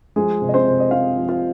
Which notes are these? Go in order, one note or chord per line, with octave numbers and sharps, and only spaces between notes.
F3 G#3 G#4
C3
D#5
C4 C5
C3
D#5
C4 F4 F5
F3
F4 F5